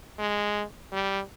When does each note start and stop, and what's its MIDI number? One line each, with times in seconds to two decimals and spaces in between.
0.18 0.63 56
0.92 1.21 55